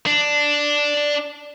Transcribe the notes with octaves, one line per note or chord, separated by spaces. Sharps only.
D4